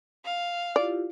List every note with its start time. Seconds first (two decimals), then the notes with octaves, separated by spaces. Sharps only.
0.25 F5
0.76 E4 F4 G4 D5